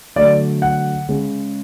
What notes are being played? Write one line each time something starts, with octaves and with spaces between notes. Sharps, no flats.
D3 F#3 A3 D5
F#5
C#3 G#3 C#4